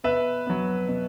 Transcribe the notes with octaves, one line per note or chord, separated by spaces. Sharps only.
B2 B4 E5
F#3 B3
B2